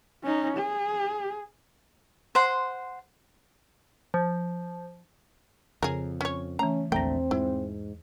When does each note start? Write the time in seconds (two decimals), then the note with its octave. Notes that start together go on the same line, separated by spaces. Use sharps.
0.24 C#4 D#4
0.57 G#4
2.35 C5 F#5 C6
4.14 F3
5.83 F2 C#3 G#4 A#4
6.21 C#4 C#5
6.59 E3 A3 C#4 A#5
6.92 A#1 E2 D3 A3 C4 G5 A#5 A#6
7.31 G#2 E4